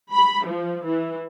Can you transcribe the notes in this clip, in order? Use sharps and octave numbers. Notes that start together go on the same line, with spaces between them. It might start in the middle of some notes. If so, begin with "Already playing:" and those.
B5
F3
E3